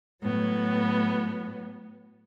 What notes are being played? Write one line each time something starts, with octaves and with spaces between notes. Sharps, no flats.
A2 F#3 B3